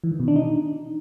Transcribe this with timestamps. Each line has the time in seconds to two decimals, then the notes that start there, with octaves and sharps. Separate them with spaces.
0.04 E3
0.12 D#3
0.20 B2
0.28 D4
0.36 D#4